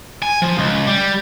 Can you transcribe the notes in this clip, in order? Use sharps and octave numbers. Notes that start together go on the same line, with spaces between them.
G#5
F3
C#2
G3